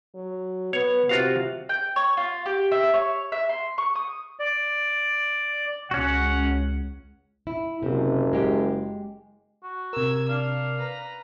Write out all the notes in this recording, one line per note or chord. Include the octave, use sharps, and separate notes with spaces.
F#3
B3 C#5
C3 F4 F#4 F5
G5
C#5
F4
G4
E5
C#5
E5
C6
C#6
D#6
D5
C#2 C#4 F#4 F#5
E4
F#1 C3
G#3 G4
F#4
C3 A#4 E6 G#6
D4 F5
B4 A#5